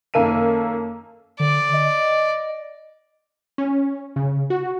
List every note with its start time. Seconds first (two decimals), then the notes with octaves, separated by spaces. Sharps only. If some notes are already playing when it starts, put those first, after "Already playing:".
0.14 F#2 D#3 A#3 A4 D#7
1.40 D3 D5
1.73 D#5
3.58 C#4
4.16 C#3
4.50 F#4